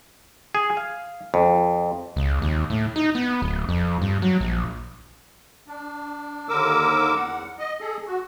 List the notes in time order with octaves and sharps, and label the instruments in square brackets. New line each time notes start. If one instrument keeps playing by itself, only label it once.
[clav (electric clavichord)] G#4
F5
F2
[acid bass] C#2
D#2
A2
D#4
B3
D1
F2
G2
F#3
A#1
[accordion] D4
D#2 D3 A#4 D6 E6
E2 F#5
D#5
G#4 A4
F#4